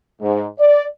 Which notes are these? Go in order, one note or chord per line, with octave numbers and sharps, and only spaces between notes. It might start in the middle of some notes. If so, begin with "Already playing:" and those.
G#2
D5